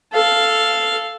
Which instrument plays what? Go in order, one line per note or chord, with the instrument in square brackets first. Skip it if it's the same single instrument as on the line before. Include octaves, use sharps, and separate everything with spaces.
[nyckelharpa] A4 F5